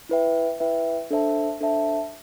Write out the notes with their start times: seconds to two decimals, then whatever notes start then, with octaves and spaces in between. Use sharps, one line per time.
0.09 E4 B4 E5 G5
0.60 E4 B4 E5 G5
1.11 D4 A4 C5 E5 A5
1.61 D4 A4 C5 E5 A5